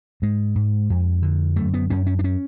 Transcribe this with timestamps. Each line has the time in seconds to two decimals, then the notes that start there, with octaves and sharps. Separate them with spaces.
0.22 G#2 G#3
0.56 G#2
0.90 F2
1.23 D3
1.56 F#2 A3
1.74 B3
1.90 F#2 C#4
2.07 C#4
2.19 D4
2.24 C#4